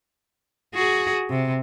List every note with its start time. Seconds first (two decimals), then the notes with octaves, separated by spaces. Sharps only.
0.74 F#4 G#4
1.30 C3